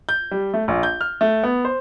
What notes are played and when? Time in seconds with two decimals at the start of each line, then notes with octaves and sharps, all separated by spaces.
0.09 G6
0.31 G3
0.54 A3
0.68 A#1
0.83 G6
1.01 F6
1.21 A3
1.43 B3
1.65 C5